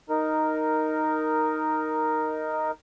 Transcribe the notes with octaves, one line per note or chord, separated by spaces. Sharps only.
D#4 A#4